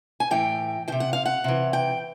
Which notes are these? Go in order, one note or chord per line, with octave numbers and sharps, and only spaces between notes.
G#5
A2 E3 G5
C3 D#3 G5
F#5
F5
F#5
C3 E3
G5